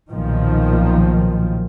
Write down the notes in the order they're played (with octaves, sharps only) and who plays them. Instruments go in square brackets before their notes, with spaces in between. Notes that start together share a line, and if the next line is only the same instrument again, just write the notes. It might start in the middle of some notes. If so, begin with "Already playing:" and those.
[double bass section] B1 A#2 D#3 F3